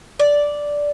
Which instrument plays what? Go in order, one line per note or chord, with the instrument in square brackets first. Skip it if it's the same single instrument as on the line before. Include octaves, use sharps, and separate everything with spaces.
[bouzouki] D5